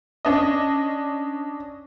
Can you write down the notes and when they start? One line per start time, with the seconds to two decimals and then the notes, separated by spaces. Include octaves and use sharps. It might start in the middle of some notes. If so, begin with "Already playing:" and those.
0.25 C#4 D4 D#5